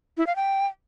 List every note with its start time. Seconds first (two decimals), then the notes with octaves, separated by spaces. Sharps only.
0.17 E4
0.27 F5
0.36 G5